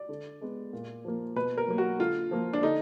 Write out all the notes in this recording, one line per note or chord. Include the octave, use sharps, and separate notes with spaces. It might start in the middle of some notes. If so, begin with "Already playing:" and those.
Already playing: D5
D3
G#3 B3
A#2
F3 A#3
B2 B4
A#4
F#3 A#3
F#4
D3 F4
F3 A#3
D4
D3 D#4